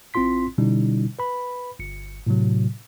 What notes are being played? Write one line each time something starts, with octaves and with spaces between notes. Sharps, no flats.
A1 C4 E4 F4 C6 B6
B2 D3 G3 C#4 D#4 E4
B4 B5
G1 C#7
A2 C3 F#3